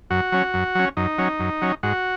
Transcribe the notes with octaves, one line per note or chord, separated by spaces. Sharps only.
F#2 F#4
F#3 C#4
F#2
F#3 C#4
F#2 D#4
F#3 C#4
F#2
F#3 C#4
G#2 F#4